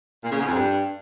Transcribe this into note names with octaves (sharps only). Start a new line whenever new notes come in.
A#2
C#3
G#2
F2
G2